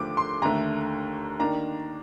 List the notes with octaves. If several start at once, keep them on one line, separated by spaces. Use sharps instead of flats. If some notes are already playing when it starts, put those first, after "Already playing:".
Already playing: D#2 D3 F3 A3 D6
C6
D#2 D3 A3 A#5
D#3 A#3 D4 A#5